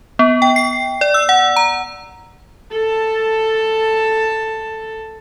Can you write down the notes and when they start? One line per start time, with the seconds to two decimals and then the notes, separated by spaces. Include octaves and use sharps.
0.19 B3
0.42 G5
0.56 C7
1.01 D5
1.14 E6
1.29 F#5
1.56 A#5
2.73 A4 A5